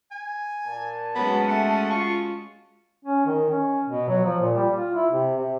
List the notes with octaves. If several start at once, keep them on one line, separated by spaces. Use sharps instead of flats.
G#5
A#2 A5
F#3 G#3 B3 C#4 F#4
A3 F#5
F4 C#6
C#4
D#3
C#4
B2
F#3
F3
A#2
G3
F4
E4
C3
C3